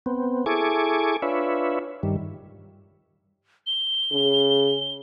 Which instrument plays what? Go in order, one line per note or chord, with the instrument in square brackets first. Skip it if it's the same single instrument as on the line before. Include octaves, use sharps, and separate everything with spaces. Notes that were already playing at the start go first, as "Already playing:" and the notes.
[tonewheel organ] B3 C4
E4 G#4 A4 G#5 C#6 D6
D4 F4 B4 C#5 E5
G2 D#3 G3
[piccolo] G7
[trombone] C#3